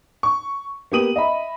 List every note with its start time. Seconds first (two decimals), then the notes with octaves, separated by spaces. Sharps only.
0.23 C#6
0.92 A#3 B3 G4 D#6 D#7 F#7
1.16 D#5 E5 B5